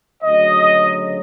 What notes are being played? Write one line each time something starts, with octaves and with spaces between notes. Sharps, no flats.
D2 C#3 F#3 D#5